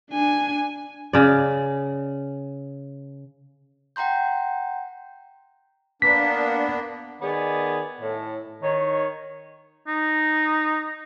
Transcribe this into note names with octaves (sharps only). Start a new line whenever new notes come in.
D4 G#5
C#3 D5
F#5 G5 A#5 C6 G6
A#3 B3 D4 B6
D#3 B3 G#4 D5
A2 A4
D#3 C#5
D#4